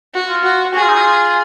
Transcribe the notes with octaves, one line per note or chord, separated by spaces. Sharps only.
F#4
F4
F#4
F#4 G#4
F4
D#4
F4